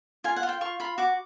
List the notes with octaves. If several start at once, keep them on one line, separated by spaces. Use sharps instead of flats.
F4 G#5
F#5
F4
G5
F4 C#6
F4 B5
F#4 D6